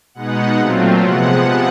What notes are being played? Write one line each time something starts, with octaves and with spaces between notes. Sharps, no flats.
B2 G#3 B3 D#4 F#5
A#2 F#3 A3 C4 F4
C3 F3 G#3 B3 F#5